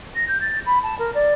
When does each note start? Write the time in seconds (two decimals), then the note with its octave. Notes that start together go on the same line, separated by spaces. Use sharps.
0.15 A#6
0.28 G6
0.41 A6
0.66 B5
0.83 A5
0.99 A#4
1.14 D5